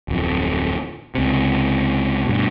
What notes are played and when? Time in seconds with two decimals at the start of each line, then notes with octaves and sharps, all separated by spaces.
0.08 D1 F2
1.15 C#2 C3
2.25 G2 B2